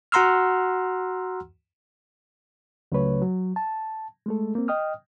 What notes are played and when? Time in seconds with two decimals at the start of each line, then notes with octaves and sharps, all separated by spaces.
0.12 F#4 F#5 A#5 C6 E6 F6
2.92 C#2 C#3 F#3 A3 B4 C#5
3.22 F#3
3.56 A5
4.26 G#3 A3 A4
4.55 A#3 C4
4.68 D#5 G5 D#6 F6